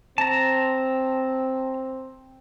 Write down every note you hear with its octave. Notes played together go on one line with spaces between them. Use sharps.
C4 A5 A#5